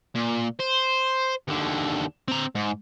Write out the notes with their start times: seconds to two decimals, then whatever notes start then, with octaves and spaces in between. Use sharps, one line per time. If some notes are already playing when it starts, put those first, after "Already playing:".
0.15 A#2
0.60 C5
1.48 D#2 D3
2.28 C4 A#5
2.55 G#2